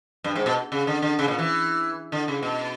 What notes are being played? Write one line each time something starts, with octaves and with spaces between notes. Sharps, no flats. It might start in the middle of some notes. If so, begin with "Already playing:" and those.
G2
G#2
B2
C#3
D3
D3
C#3
A#2
E3
D3
C#3
B2